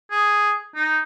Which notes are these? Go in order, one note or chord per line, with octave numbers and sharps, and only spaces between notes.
G#4
D#4